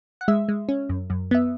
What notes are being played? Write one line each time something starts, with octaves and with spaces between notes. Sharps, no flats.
F#5
G#3 E5
G#3
C#4
F#2
F#2
B3 E5